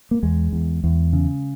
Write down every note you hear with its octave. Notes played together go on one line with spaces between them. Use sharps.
A#3
E2 G#3
E2
E2
C#3